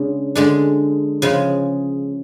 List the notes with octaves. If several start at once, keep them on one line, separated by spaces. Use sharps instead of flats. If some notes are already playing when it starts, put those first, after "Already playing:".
Already playing: C#3 G#3 D4
D3 G#3 D4
C#3 F3 G#3